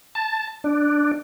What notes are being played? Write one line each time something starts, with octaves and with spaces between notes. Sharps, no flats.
A5
D4